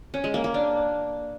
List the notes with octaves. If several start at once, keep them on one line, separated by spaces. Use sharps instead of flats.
C#4
G#3
A#3
A#3
D4